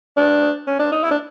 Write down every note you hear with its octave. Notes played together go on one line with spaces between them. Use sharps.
D4
C#4
D4
D#4
E4
D4